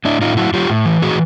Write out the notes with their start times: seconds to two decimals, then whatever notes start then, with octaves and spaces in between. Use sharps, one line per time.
0.05 A2 D4 E4
0.21 A2 D#4 F4
0.37 F#3 E4 F#4
0.53 F#3 F4 G4
0.70 A2
0.86 E3
1.02 A2 F#4 G#4